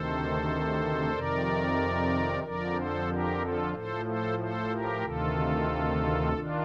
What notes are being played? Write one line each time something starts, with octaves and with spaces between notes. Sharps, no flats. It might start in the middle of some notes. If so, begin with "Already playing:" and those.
Already playing: D2 C3 D#3 A4 C5
F2 C3 D#3 A#4 D5
F2 D3 F3 A#4 D5
A4 C5
G4 A#4
F4 A4
A2 F3 A4 C5
A4 C5
A4 C5
G4 A#4
D2 C3 D#3 F4 A4
D#3 D4 F4